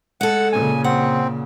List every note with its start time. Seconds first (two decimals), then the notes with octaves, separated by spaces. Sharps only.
0.21 G#3 A4 F#5
0.53 A#2 C#3 G#5
0.84 C4 F#5